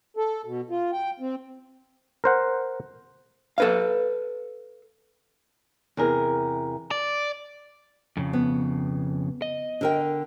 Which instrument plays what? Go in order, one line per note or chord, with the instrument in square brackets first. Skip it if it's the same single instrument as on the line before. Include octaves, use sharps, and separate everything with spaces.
[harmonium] A4
B2
F4
G5
C4
[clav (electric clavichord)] A#4 C5 F#5
[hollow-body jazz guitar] A4 B4 F5
[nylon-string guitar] E2 C3 G#4 A#4
[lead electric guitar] D5
F2 C#3
[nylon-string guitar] B3
[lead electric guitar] D#5
[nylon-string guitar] D3 A#4 G5